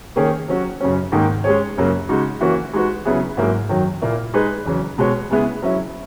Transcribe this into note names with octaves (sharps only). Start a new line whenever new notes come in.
D#3 A#3 C#4 G#4 C#5
F#3 C#4 F#4
F#2 C#3 F#3 C#4
G#2 D#3 A#3 D#4 G#4
G#3 C#4 G#4 C#5
F#2 C#3 F#3 A#3
C#3 G#3 D#4 F#4
E3 A#3 C#4 F#4
G#3 D#4 F#4 B4
C#3 F#3 B3 E4 G#4
G#2 F#3 A#3 E4 G#4
F#2 D#3 F#3
A#2 A#3 E4
G#3 D#4 G#4 B4
E2 C#3 F#3
B2 G#3 B3 F#4 C#5
C#3 G#3 B3 E4 G#4
F#3 C#4 E4